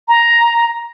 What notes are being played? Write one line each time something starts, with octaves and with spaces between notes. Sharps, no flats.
A#5